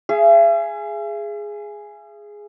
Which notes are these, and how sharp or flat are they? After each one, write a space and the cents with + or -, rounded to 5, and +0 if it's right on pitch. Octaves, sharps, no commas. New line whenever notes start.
G#4 +0 E5 +45